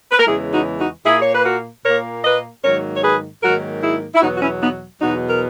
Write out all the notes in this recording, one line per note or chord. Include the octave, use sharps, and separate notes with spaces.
B4
A#4
E2 C#3 E3 G#3 E4 G#4
D#4 F#4
D#4 F#4
A#2 A#3 E4 G#4
C#5
B4
F#4 A#4
A#2 A#3 A#4 C#5
B4 D#5
G#2 D#3 F#3 A#3 A#4 C#5
C#5
G#4 B4
G#2 D#3 F#3 A#3 F#4 A#4
E4 G#4
E4
E2 B2 F#3 B3 D#4 F#4
F#4
C#4 E4
B3 D#4
E2 B2 F#3 B3 D#4 F#4
A#4